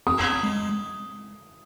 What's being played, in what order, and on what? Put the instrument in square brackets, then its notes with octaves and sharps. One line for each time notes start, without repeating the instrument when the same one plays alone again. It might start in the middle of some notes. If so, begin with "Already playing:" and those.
[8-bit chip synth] C4 [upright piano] D#6
[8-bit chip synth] G#3